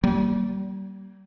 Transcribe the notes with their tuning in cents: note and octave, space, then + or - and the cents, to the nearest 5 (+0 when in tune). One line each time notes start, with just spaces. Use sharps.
G3 -35 A#3 +0